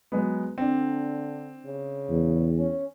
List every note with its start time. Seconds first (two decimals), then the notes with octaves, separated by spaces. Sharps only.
0.12 F#3 G#3 B3
0.58 D3 C4 D4
1.65 C#3
2.10 E2
2.59 C#4